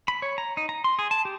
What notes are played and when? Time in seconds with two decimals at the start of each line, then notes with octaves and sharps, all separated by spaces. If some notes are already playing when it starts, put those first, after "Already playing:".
0.08 B5
0.22 C#5
0.38 A#5
0.57 D#4
0.69 A#5
0.84 C6
0.99 G#4
1.11 A5
1.25 G4